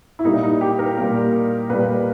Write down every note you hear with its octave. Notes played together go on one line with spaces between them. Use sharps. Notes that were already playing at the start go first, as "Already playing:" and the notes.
E4
A#2 G3 A#3 D#4
D#4
G4
A#4
A#2 G3 A#3
A#2 G3 A#3 B4